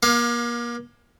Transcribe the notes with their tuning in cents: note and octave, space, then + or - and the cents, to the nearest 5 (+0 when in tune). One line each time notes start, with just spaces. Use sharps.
A#3 +35 F5 +20